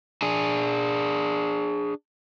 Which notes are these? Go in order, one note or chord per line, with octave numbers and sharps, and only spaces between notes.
D4 G#4